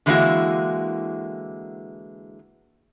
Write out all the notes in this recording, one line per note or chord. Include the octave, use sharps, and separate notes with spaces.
D3 E3 G#3 A#3 E4 F#4